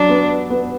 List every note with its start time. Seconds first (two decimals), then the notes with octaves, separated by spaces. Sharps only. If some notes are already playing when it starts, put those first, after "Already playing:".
Already playing: F#3 D4
0.09 B3
0.50 B3